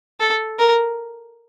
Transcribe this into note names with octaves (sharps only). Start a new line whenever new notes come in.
A4
A#4